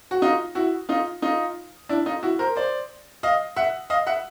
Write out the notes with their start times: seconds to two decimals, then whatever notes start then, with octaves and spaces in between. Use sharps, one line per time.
0.11 F#4
0.22 D#4 F4
0.55 E4 F#4
0.89 D#4 F4
1.22 D#4 F4
1.89 D4 E4
2.06 D#4 F4
2.23 E4 F#4
2.39 A#4 C5
2.56 C5 D5
3.23 D#5 F5
3.56 E5 F#5
3.90 D#5 F5
4.07 E5 F#5